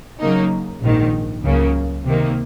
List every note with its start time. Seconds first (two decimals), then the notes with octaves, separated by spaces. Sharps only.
0.20 C#3 F#3 A#3 D#4
0.82 A#1 G#2 D#3
1.43 C#2 C#3 F#3 A#3
2.05 C3 D#3 A#3